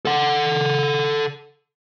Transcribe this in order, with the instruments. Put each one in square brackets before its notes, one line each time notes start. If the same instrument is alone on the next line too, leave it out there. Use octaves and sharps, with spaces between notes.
[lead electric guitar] A4 F#5